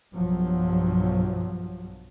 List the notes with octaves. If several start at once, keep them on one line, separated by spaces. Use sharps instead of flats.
B1 G2 F3 F#3